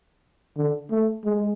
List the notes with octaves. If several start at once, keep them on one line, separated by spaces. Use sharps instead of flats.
D3
A3
G#3